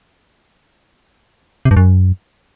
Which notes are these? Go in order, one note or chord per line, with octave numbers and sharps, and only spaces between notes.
C3
G2
F#2